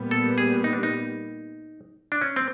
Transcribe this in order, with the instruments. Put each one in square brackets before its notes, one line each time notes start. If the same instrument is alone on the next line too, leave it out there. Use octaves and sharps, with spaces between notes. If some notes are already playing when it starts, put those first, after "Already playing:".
Already playing: [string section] A#2 G3 B3
[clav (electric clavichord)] A4
G#4
D#4
D4
D#4
D4
C#4
C4